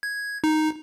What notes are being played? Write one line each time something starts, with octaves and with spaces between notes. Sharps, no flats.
G#6
D#4